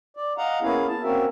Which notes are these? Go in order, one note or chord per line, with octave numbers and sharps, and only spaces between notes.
D5
D#5 F5 F#5 A#5
A#3 B3 C#4 E4 G#4 F5
A5
A#3 C4 C#4 F#4 A#4 E5